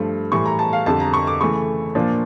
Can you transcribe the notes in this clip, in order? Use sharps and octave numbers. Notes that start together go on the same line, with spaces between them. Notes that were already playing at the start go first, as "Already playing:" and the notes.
Already playing: G2 F3 A3
A2 E3 G3 C#6
A#5
A5
F5
F2 D3 G3 A5
A#5
C#6
D6
C#3 E3 A3 C#6
A#2 F3 A#3 D4